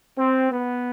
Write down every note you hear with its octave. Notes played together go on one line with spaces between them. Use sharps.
C4
B3